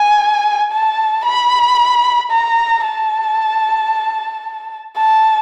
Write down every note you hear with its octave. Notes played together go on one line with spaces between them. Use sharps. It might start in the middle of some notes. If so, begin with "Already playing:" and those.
Already playing: G#5
A5
B5
A#5
A5
A5